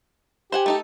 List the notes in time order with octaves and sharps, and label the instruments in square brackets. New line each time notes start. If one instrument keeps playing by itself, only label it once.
[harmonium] G4 [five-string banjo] C5 F#5 G#5
[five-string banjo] A3 D#4 A4